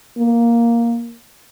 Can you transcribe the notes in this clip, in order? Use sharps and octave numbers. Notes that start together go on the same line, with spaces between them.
A#3